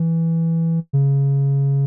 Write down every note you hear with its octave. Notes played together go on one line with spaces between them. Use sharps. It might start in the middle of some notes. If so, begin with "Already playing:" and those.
Already playing: E3
C#3